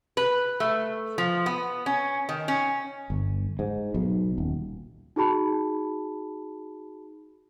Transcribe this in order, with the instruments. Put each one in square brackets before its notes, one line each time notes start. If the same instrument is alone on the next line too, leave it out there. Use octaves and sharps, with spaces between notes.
[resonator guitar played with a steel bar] B4
A3
F3
B3
C#4
D#3
C#4
[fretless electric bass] G1
G#2
B1
D#1
[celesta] D#4 F#4 G#4 A5 B5